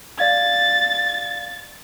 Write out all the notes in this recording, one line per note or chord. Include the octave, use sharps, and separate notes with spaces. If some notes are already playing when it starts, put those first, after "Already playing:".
D5 F5 G#6 A6